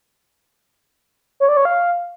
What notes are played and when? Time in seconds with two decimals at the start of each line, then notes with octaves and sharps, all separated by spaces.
1.40 C#5
1.49 D5
1.57 C#5
1.65 F5